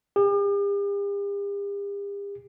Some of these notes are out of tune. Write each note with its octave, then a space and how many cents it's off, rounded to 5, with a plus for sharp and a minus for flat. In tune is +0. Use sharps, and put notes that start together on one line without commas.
G4 +45